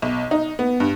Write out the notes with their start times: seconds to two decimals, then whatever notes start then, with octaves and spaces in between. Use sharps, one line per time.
0.02 B1
0.31 D#4
0.59 B3
0.80 G2